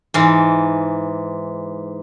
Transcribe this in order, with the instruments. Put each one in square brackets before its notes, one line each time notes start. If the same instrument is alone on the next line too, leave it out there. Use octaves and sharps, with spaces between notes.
[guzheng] G#2 E3